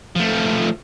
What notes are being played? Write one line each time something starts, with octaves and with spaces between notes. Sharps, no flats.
F3 A3